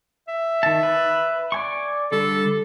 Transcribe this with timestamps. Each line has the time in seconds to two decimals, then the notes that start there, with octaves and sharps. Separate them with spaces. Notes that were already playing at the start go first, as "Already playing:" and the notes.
0.28 E5
0.63 D#3 A5
0.83 B4
1.52 D5 G#5 C#6
2.12 D3 G3 A4